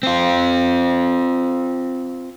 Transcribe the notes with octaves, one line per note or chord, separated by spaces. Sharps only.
C4 F4